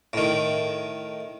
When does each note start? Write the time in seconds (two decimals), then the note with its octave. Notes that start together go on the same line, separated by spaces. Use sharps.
0.13 A2 D#3